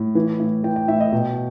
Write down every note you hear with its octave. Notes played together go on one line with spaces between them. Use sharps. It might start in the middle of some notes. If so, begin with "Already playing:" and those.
Already playing: A2
E3
A2
E3 G5
G5
A2 E5
D#5
B2 G5